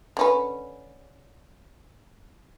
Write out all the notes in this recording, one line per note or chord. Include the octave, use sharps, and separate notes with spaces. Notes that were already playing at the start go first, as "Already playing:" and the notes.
D3 C#4 B4